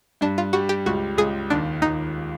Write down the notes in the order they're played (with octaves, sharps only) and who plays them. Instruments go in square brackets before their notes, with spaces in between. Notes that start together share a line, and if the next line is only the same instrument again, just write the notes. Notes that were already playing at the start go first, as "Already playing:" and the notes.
[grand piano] G2 [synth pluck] D4
[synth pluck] F4
[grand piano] G3 [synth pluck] F#4
[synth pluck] G4
[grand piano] C#2 [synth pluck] F#4
[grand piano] C#2 [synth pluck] G#4
[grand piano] D#2 [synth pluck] D4
[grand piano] D#2 [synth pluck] D#4